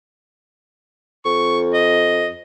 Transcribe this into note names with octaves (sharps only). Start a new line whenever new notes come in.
F2 C#6
D#5